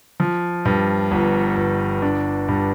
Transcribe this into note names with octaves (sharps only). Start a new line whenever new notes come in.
F3
G2
G1
G1
D4
G2